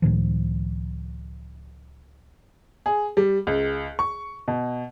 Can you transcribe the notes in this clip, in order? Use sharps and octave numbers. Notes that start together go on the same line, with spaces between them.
C#2 A2 D#3 F3
G#4
G3
C#2
C#6
B2